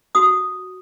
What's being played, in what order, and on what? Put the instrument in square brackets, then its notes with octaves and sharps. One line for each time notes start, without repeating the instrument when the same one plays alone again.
[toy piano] F#4 D#6